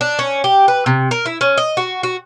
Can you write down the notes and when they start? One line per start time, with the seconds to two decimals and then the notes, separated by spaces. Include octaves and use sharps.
0.01 D4
0.19 C#4
0.44 G4
0.68 B4
0.86 C3
1.11 A#4
1.26 E4
1.41 C#4
1.58 D#5
1.77 F#4
2.03 F#4